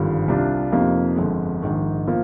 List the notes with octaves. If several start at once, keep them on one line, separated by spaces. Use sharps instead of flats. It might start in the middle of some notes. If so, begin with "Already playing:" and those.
Already playing: G#1 G2 D3 F3
C2 C3 G3 D4 F4
F2 C3 F3 A#3 D#4
G1 F2 D3 G#3
A#1 G#2 D#3
F3 A#3